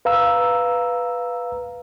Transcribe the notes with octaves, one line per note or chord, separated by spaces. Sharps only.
B4 F5 A#5 E6